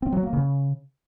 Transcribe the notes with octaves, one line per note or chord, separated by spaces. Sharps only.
C4
F#3
A#3
C#3